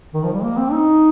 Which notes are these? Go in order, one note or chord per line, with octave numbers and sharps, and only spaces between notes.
D#3
F3
G3
A#3
C4
D#4